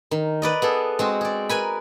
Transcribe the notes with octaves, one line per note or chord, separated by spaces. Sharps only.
D#3
B4 D5 D#5
B3 G#4 A4
G#3 C4 F#4
G#4 D5
A#4 B4 G#5 B5